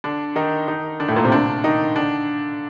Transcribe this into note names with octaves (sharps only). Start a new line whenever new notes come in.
D3 D4
D#3 D#4
D#3 D#4
D3 D4
A2 A3
A#2 A#3
C3 C4
D3 D4
D#3 D#4
D3 D4